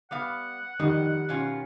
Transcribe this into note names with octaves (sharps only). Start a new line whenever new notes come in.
G3 B3 F5 F#5
F2 D#3 G3 D#4 D#5
B2 C#4 F4